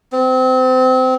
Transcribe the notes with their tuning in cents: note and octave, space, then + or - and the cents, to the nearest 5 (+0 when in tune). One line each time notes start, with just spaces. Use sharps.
C4 -25